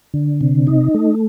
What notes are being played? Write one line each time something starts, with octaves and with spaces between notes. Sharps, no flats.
D3
C3
D#4
A3